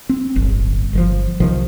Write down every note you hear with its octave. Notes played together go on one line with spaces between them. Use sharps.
C4
D1 G1
G1 D#3 F3
B1 C3 D#3 F3